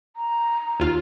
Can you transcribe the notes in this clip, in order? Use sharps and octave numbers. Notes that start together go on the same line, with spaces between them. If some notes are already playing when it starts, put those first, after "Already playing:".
A#5
D#2 F4 F6